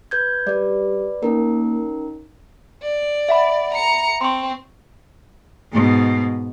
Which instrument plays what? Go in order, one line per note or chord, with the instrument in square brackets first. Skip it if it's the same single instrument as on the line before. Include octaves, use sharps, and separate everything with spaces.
[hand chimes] B4 G6 G#6
[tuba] G3 [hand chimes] B4 D5
[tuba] A#3 [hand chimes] C#4 D#4 A#4
[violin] D5
[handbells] E5 F#5 B5
[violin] A#5 C#7
[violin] C4 [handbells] C6 C#6
[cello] G#2 B2